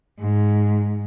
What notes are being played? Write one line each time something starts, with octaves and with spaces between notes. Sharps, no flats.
G#2